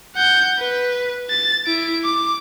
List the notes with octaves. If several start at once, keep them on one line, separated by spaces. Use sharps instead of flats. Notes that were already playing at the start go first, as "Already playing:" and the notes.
F#5 G6
B4
A6
E4 D7
D6